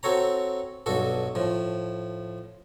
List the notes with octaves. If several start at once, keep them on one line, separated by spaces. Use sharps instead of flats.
C4 F#4 A4 C#5 A#5
B1 G2 F#4 A4
A2 F3